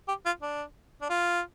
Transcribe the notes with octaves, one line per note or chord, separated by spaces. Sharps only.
G4
F4
D4
D4
F4